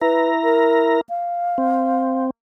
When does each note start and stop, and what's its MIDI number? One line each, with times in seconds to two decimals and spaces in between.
0.01 1.01 64
0.01 0.29 71
0.01 1.01 82
0.44 0.99 70
1.09 2.25 77
1.58 2.30 60